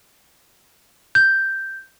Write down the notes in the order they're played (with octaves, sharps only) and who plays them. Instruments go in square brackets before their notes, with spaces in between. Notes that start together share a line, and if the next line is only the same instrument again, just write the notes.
[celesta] G6